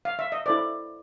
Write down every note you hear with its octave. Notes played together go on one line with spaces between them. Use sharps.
F5
E5
D#5
E4 A4 C5 D5